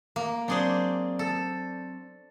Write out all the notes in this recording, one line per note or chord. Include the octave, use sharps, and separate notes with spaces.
A#3
F#3 C4 D4 G#4 C5 D5
A4